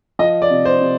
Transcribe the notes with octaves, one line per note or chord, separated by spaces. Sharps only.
F3 D#5
D5
C3
C5
C3